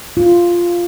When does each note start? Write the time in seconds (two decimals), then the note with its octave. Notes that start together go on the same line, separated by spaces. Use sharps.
0.17 F4